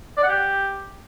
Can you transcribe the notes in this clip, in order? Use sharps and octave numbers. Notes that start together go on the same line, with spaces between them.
D5
F#5
G4